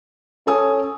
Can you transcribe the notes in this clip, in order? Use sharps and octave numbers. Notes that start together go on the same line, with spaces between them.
C#4 A4 G#5 D#6